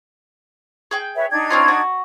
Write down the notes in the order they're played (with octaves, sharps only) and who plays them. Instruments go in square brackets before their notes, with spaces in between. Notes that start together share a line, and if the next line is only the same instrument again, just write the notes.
[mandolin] G#4 G5 G6
[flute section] B4 C#5 E5
D4 D#4 G#6
[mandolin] C4 C#4 F4
F#4